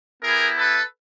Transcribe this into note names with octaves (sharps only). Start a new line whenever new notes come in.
B3 E4 G4 G#4 A#4
A4 B4